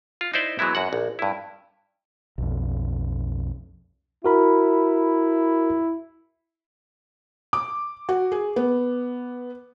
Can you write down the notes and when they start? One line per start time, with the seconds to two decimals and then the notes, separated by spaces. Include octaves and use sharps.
0.21 F4
0.34 D#4 E4 C5 D5 E5
0.59 E3 F#3 G#3 B3 E4
0.75 F#2 F#4 F#5
0.93 A#1
1.19 G2 E4
2.38 B1 F2
4.25 E4 F#4 A#4 B5
7.53 D6
8.09 F#4
8.32 G#4
8.56 B3